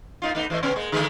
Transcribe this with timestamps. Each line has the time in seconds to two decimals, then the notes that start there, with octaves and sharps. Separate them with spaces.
0.22 A#3 D#4 F4
0.35 A3 B3 D#4
0.50 E3 A3 D#5
0.63 C3 B3 C#4
0.76 G#3 A#3
0.92 D3 G#3 A3